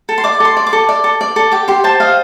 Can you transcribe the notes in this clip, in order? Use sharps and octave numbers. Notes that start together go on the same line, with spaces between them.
A4
C6
D5 D6
A4 C6
D5
D6
A4
D5
A4
D5
A4
G4 D6
G4 C6
C5 A5
D#5 F5